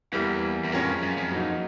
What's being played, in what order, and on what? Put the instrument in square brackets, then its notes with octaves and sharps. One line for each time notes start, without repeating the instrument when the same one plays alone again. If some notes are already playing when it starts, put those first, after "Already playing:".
[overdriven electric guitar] E2 [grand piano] E3 G3 A#3
[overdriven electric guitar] E2
[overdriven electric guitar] F2 [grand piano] G#3 C#4 F4 A#4
[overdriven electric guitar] F#2
F2
[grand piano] F#3 A#3 D#4